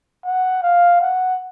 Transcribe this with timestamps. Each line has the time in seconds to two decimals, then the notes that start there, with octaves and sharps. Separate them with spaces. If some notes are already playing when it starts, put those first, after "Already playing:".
0.25 F#5
0.63 F5
1.01 F#5